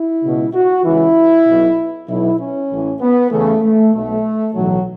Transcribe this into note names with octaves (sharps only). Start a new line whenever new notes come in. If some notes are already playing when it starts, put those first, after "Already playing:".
Already playing: E4
C#2 B2
F#4
C#2 C#3 E3 E4
B1 B2
B1 B2 E4
C#4
A1 A2 E3
B3
E2 C#3 E3 A3
A3
B1 B2 A3
B1 A2 E3 F#3